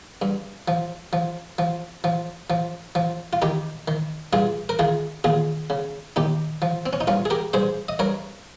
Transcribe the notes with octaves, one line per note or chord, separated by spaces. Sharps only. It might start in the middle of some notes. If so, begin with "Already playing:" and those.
G2
F3
F3
F3
F3
F3
F3
F4
D#3 D#4 G4
D#3
G2 F4 G#4
A#4
D#3 F4 G#4
D#2 F4 G#4
C#3
D#2 D#4 G4
F3
C4
C#4
D#4
G2 C#4 F4
G#4
G4 A#4
G2 G#4 C5
D#5
G2 A#4 C#5